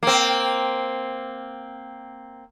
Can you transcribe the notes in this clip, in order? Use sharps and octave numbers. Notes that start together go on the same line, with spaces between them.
A#3 C4